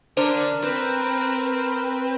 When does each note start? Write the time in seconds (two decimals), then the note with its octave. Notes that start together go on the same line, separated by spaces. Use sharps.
0.17 D3 D4 A#4 C5
0.64 C4 B4